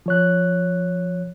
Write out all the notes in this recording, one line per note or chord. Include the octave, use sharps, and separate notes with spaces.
F3 C#5 F#6